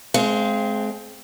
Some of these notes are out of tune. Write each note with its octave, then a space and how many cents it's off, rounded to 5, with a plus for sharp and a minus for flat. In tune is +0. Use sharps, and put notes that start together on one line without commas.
G#3 +30 C4 +0 F5 -15